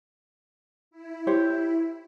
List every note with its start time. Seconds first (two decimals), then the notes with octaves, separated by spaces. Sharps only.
0.91 E4
1.27 G4 C5 C#5